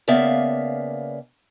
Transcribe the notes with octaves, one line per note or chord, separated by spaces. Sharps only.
C#3 A#3 B3 D5 E5 F5